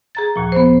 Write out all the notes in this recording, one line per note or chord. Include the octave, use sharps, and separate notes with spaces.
G#4 A#5 A6
D#2 A#2 F3
B3 C5